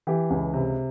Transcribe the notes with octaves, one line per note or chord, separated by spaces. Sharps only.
E3 G4
C#2
C3